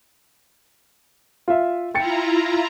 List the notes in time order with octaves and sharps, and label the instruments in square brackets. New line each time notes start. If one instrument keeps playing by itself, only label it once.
[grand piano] F4 E5
[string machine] E4 F4 A#5 [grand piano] G5 A6 C#7